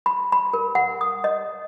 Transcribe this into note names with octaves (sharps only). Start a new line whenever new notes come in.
B5
B5
A#4
F#5
D#6
D#5